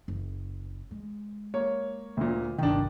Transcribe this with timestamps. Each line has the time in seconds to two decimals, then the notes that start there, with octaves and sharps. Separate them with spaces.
0.08 F#1
0.91 G#3
1.54 A#3 C#5
2.17 D2 A#2
2.58 G1 C2 D#3 D4